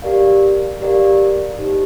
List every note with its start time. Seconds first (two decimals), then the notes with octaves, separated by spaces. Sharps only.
0.02 G4 A#4 D5 F5
0.81 G4 A#4 D5 F5
1.59 D#4 G4 C5